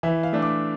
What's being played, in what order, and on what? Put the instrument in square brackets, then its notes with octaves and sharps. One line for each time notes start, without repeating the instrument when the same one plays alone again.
[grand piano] E3 E5
F5
A3 D4
D6